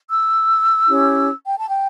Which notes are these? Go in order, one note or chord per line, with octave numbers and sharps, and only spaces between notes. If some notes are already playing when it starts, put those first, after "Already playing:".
E6
C#4 E4 G4 C#5
G5
A5
G5